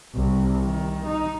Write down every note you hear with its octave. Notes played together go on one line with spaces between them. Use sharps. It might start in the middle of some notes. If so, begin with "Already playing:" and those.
C2
D#3
D#4